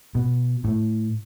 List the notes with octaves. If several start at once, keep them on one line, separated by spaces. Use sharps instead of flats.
B2
A2